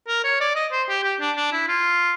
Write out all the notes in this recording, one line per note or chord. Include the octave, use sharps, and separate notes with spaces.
A#4
C#5
D5
D#5
C5
G4
G4
D4
D4
E4
F4